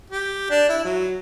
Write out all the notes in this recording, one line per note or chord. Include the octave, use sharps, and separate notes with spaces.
G4
D4
E4
F#3